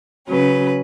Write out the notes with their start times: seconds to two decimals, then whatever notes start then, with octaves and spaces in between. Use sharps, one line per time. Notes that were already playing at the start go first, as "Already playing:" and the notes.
0.28 C#3 F#3 C#4 B4